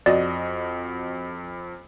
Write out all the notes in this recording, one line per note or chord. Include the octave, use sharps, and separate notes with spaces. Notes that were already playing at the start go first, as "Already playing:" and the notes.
F2 F#4 D5 D#5